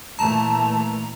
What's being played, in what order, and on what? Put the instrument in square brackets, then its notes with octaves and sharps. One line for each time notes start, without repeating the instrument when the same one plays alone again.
[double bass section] A#2 E3 A3 [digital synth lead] A5 [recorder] A#5